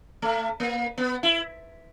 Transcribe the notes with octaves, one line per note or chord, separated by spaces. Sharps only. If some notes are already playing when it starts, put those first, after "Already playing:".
A3
A#3
B3
E4